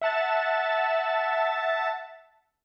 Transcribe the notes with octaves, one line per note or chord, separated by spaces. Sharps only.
E5 F#5 A5 A6